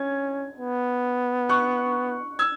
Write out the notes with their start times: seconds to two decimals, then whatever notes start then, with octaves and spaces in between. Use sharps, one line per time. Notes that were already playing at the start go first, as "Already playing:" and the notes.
Already playing: C#4 G#6
0.58 B3
1.49 C#6 F#6
2.39 E6 G#6